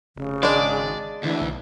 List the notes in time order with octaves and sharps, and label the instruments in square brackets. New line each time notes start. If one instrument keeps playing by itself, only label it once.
[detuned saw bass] F1 [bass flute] C#3
[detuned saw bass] G#1 [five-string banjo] G#3 D4 [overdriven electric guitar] D5
[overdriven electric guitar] D2 [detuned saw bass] D3 [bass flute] E3
[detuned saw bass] B1